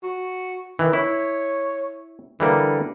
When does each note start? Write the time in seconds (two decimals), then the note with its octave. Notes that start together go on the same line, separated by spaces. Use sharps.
0.03 F#4
0.79 D#3 E3
0.93 E4 C#5
2.40 D3 E3 G3 A#3